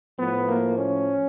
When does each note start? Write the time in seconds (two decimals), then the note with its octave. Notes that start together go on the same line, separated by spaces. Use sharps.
0.19 A2 F3 B3
0.49 A#3
0.79 C#4